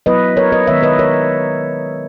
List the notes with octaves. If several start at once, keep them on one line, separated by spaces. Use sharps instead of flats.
F#3 B3 E4 B4 D#5
A#4 C#5
B4 D#5
D#3 G#3 B3 C#5 E5
B4 D#5
A#4 C#5